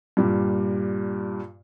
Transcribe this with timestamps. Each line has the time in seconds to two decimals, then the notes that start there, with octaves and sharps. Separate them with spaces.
0.17 G2 A#2 G3